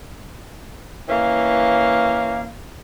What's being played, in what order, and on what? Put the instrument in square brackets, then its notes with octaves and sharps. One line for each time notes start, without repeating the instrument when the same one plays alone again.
[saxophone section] E3 A#3 C#4 F5